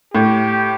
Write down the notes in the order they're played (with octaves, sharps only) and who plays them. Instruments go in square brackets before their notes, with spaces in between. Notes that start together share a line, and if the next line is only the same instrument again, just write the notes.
[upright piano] A2 [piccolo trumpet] G4